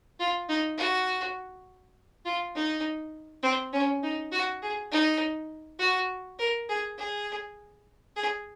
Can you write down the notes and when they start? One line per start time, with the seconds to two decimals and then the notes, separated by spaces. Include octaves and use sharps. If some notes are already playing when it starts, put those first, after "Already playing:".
0.19 F4
0.49 D#4
0.78 F#4
2.25 F4
2.55 D#4
3.43 C4
3.73 C#4
4.03 D#4
4.32 F#4
4.62 G#4
4.92 D#4
5.79 F#4
6.39 A#4
6.69 G#4
6.98 G#4
8.16 G#4